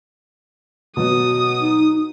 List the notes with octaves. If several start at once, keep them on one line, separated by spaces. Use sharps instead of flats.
B2 F#3 D#6
D#4